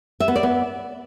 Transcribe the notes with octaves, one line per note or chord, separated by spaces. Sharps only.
E5
B3
D5
B3